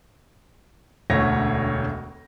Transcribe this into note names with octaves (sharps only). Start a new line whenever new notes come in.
E1 D2 A3 C#4 C#5 A#6